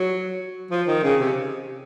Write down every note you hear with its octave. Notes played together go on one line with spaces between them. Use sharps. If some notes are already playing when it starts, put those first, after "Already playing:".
Already playing: F#3
F3
D#3
C#3
C3